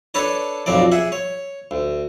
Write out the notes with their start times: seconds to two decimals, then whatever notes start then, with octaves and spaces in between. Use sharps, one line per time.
0.14 D4 A4 B4 C#5 A5
0.66 B1 F2 B2 F#3 D5
0.92 G#4 E5 F#5
1.12 C#5
1.71 D2